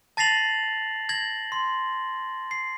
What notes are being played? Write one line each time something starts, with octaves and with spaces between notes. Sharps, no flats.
A5 A6 A#6 C7 F7 F#7
G#6 A#6 F#7
C6
C7